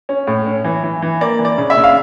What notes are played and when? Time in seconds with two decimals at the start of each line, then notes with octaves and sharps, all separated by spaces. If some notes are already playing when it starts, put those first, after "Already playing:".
0.09 C#4
0.27 A2
0.47 C#4
0.64 E3
0.83 E3
1.02 E3
1.21 A#3 D5
1.39 E3
1.45 D5
1.58 C#3
1.70 E5
1.77 C#3
1.84 F5